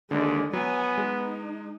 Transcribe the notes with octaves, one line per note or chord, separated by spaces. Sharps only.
D#2 D3 G#3 D5
F#3 B3 G#5
G#3 D#4